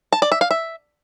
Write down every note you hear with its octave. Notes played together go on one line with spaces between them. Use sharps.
A5
D5
E5
F5
E5